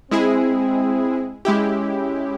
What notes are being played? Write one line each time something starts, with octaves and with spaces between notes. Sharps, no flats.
G#3 C4 E4 G#4
G#3 C#4 E4 G4